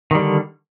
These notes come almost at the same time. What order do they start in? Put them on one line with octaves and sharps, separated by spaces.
D#3 G3 D3